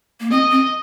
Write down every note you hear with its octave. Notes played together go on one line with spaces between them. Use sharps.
A#3
C4 D#5
C4